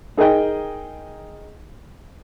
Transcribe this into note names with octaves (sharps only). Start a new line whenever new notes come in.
D#4 G#4 A#4 D#5 G5